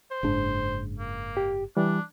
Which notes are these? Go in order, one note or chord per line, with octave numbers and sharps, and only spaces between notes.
C5
F#1 G#2 D4
A#3
G4
E3 G3 D4